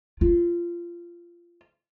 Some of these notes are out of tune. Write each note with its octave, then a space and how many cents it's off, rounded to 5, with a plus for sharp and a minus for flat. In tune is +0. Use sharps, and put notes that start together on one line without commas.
F4 -20